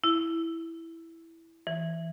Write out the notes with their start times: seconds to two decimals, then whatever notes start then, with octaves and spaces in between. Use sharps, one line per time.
0.04 E4
1.67 E3